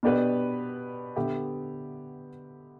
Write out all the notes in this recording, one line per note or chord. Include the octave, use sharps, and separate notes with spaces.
B2 B3 D4 G4 B4
D3 B3 G4 E5